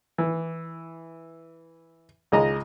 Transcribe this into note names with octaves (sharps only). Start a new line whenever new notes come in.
E3
C#2 G#3 D#5 A#5